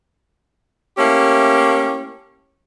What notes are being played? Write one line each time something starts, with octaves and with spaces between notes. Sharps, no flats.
A3 A#3 C#4 E4 G4